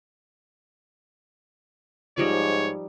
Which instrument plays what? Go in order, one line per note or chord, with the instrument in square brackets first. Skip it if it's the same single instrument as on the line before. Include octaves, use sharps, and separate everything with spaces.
[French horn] G#2 [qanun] F3 G3 D#4 [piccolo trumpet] C#5